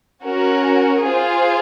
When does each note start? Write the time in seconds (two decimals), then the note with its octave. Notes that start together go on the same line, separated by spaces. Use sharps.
0.24 C#4 F#4 A#4
1.05 F4 G#4 C5 F5